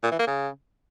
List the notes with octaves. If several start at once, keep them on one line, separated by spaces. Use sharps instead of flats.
A#2
E3
A#3
C#3